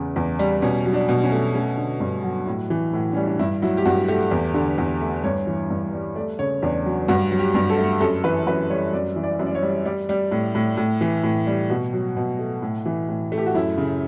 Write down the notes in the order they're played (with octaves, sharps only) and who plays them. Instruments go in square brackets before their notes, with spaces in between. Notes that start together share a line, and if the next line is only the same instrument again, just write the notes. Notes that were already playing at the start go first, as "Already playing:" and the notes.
Already playing: [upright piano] E2 C#3
E2
G3
B2 C#4
F#3
D4
B2
C#4
A3
A3 C#4
D3
G2
F#3
A2
E3
A2
G3 C#4
D4
G2 E4
F#3 E4
G4
G2 F#4
A3 G4
E2
D3
E2
A3
G2 C#5
E3
G2
G3
A3 D5
C#3 C#5
E2 D4
F#3
G2 F#4
F#3
G4
G2
A4
A3
F#2 A4
E3 B4
F#2 B4
G3 C#5
F#2 D5
E3
D5
F#2
D5
C#5
G3
G3 D5
G3
A2
A2
A2
E3
A2
G3
B2 F#4
F#3
B2
A3
A2
E3
A2
A3
G4
F#4
F#2 E4
C#3